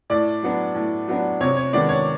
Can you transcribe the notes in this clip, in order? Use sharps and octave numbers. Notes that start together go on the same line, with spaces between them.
A2 D5
F#3 B3 D4
A2
F#3 B3 D4
C3 C#5
C#5
D#3 G#3 B3 D4 D5
C#5